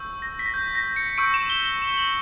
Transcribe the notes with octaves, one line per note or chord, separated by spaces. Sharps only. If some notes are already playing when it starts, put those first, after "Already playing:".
Already playing: C#6 E6 G6
A#6
B6
A#6
G6
A#6
C#7
C#6 E6 G6 D7
E7
G7
G7
E7
F#7